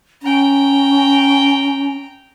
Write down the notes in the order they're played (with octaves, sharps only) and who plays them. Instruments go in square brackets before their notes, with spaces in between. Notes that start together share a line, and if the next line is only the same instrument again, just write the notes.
[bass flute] C#4 [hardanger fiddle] G5 A#5